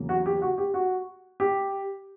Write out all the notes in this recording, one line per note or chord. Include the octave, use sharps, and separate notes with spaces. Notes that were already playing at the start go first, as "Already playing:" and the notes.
Already playing: E2 C#3 F#3 A#3
F#4
G4
F#4
G4
F#4
G4